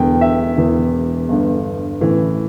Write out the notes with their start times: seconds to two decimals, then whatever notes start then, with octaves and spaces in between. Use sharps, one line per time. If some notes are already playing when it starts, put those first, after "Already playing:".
Already playing: E1 E2 D3 G5
0.21 E5
0.57 E1 E2 E3
1.29 G1 G2 D3
2.01 A1 A2 E3